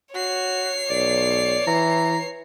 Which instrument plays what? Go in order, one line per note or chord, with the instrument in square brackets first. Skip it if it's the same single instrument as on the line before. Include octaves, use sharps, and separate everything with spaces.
[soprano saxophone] F#4 [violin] C#5 C7
[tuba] B1 [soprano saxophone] D5
[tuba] E3 [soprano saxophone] A#5